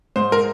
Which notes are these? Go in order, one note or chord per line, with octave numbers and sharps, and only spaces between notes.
G#2 C5
A#4